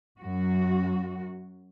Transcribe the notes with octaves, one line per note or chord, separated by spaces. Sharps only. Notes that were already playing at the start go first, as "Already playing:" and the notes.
F#2 F#4